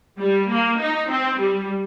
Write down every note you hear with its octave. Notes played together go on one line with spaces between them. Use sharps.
G3
A#3
D#4
C4
G3